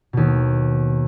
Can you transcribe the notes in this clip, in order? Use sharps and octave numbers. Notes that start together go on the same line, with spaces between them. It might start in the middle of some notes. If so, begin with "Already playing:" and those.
D#2 B2